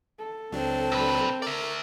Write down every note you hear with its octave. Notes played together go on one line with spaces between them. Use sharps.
A4
C#2 F#3 C4 D4
A#2 B4
A#4 D5 E5